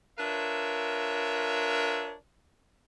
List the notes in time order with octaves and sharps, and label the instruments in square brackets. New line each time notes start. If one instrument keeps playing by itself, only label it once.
[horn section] D4 F4 A#4 B4 C#5 E5